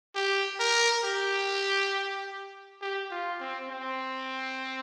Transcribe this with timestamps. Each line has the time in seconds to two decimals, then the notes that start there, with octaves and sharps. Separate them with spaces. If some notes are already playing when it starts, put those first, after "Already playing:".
0.15 G4
0.60 A#4
1.04 G4
2.81 G4
3.11 F4
3.41 C4
3.70 C4